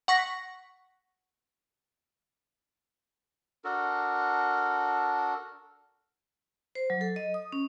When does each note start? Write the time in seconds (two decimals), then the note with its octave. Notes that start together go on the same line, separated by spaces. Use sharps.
0.08 F#5 C#6 A#6 B6
3.65 D4 F#4 A4 A#4
6.75 C5
6.90 F#3
7.01 A4
7.16 D#5
7.34 D#6
7.52 C#4